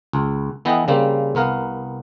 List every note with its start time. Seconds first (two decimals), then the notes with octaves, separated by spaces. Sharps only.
0.13 C#2
0.65 E3 B3 A4 D#5 G5
0.88 C#3 G3 A#3 C4
1.35 C2 B3 A#4 F5